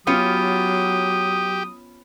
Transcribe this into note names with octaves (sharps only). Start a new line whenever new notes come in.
F#3 B3 C#4 F4 G4 D#6